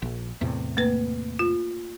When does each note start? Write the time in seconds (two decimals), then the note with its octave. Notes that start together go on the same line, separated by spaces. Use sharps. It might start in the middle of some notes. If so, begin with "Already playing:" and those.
0.02 A#1
0.41 E2 A2 C3
0.77 A3 A#3 B4
1.39 F4